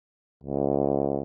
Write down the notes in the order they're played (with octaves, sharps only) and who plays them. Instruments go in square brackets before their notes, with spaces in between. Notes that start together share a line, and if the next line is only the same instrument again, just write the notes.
[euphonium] C#2